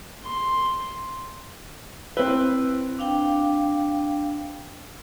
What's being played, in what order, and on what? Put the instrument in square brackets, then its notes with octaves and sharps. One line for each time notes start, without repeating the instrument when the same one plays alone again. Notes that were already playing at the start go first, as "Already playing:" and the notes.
[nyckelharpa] C6
[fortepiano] C4 B4 [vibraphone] E4
[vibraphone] D4 F5 G5